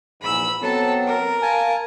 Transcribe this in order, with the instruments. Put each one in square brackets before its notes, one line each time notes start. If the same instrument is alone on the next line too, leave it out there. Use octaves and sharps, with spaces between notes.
[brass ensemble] A#1 E2 G#2 [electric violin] B5 E6
[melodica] F#3 [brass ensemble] B3 C4 [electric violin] A4 A5
[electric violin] A#4
[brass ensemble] F5 [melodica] G#5 A5